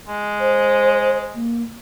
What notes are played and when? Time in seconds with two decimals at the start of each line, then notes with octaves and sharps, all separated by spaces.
0.08 G#3
0.40 C5
1.35 A#3